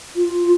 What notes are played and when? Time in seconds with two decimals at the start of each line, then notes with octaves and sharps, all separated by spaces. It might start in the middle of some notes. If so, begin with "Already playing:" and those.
0.16 F4